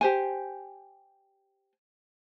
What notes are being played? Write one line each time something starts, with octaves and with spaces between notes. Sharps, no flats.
G4 C5 G#5